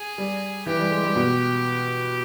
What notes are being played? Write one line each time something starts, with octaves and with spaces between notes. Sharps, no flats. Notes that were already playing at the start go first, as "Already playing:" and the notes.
Already playing: G#4
G3
E3 G4
G3
G#3
G3
B2